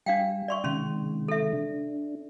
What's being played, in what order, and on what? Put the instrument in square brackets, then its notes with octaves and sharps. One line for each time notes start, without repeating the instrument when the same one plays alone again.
[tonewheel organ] G3 [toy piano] D4 F5 G5
[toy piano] D5 C6 C#6 [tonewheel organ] E5
[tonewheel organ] C3 D#3 G#3 [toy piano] C#4 C6
[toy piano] A4 E5
[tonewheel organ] D4